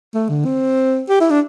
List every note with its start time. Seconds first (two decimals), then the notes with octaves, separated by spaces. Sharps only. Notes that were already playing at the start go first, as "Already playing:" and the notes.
0.14 A3
0.29 D3
0.46 C4
1.09 G4
1.21 E4
1.30 D4